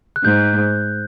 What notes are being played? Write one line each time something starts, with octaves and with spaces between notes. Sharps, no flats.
F#6
G#2 G6